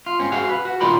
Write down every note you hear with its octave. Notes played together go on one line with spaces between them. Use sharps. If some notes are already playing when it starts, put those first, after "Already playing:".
F4
G#2 C4 C#4
F#4 G#4 F5
B4
F#4
A#2 D#3 F4 D5 G5 B5